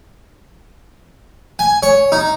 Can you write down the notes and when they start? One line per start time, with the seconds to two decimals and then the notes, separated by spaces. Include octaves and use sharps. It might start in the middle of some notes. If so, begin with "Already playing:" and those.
1.59 G#5
1.83 C#5
2.12 D#4